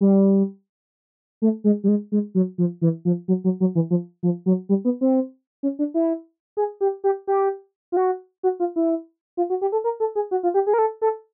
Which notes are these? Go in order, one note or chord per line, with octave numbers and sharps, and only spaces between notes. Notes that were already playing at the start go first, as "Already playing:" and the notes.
G3
A3
G#3
G3
G#3
G#3
F#3
F3
E3
F3
F#3
F#3
F#3
E3
F3
F3
F#3
G3
B3
C4
C#4
D4
E4
G#4
G4
G4
G4
F4
F#4
F#4
F4
E4
F4
F#4
G4
A4
A#4
A4
G#4
F#4
F4
G4
G#4
A#4
A4
A4